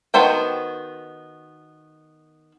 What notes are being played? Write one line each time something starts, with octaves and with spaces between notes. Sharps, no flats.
D#3 B3 F#4 C5 G5